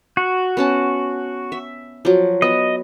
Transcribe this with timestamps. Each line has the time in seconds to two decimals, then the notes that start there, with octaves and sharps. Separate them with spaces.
0.17 F#4
0.57 B3 C#4 A5
1.52 E5
2.05 F3 F#3
2.42 B3 D#5